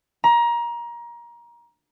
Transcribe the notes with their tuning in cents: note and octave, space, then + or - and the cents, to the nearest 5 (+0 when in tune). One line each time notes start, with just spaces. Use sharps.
A#5 +25